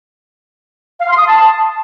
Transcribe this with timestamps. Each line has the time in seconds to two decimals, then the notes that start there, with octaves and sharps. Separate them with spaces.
1.00 F5
1.09 C6
1.18 D#6
1.27 A5